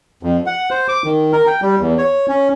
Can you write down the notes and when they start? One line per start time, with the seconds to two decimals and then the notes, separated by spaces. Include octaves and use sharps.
0.23 F2
0.46 F#5
0.71 C5
0.88 D6
1.05 D#3
1.32 A#4
1.47 G5
1.62 G3
1.80 E2
1.98 C#5
2.29 C#4